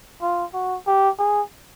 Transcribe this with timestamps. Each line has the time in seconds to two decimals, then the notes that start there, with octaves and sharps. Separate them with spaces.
0.22 F4
0.54 F#4
0.87 G4
1.19 G#4